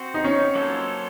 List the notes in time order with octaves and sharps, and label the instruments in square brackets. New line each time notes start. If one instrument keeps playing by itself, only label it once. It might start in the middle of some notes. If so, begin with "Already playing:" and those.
Already playing: [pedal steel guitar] C4 F#4 C5
[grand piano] D#4
C#4
[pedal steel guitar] F#3 A#3 F4 A4 C5